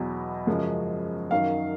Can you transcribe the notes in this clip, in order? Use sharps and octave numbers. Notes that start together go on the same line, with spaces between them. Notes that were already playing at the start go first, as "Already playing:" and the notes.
Already playing: E2 B2 F#3
F#2 C#3 F3 G#3
F#2 D#3 F#3 F5